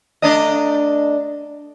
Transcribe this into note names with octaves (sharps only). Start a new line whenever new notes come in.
A3 D4 D#5